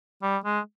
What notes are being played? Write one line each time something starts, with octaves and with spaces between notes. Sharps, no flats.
G3
G#3